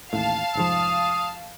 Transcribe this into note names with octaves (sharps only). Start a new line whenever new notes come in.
A1 D#2 A2 F5 A5
F1 G#2 F3 D#6